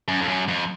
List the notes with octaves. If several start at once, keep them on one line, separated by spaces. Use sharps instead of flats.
F#2
F2
F#2
F2